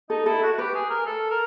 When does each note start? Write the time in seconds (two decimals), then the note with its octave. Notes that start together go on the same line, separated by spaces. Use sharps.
0.10 D#4 A4
0.26 E4 A4
0.43 F#4
0.53 F#4
0.58 G4 B4
0.74 G#4
0.90 A#4
1.06 A4
1.31 A#4